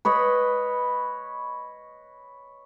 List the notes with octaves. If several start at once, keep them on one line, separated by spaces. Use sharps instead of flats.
B4 C#5 D#5 B5